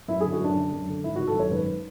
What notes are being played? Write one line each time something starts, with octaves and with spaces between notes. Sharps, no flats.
F#2 E4
D3 G#4
F#4
F#2 D4
D3
F#2
D3
G#1 E4
G#1 F#4
A4
F#2 C#5
G#1 B4